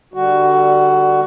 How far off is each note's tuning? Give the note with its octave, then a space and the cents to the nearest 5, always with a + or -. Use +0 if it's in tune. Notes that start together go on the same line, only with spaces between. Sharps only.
D3 +10 G3 +0 F#4 +15